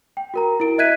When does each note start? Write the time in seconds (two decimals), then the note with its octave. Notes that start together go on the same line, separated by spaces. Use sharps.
0.17 G5
0.34 F#4 A#4 A#5
0.60 E4 A#4 D7
0.78 D#5 E5 F#6 G#6 B6 D#7